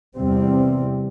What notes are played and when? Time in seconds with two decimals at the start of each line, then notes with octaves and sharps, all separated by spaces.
0.16 E2 C3 G3 C4